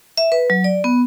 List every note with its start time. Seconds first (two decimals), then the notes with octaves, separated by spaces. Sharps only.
0.18 E5
0.32 B4
0.50 F#3
0.64 D5
0.84 B3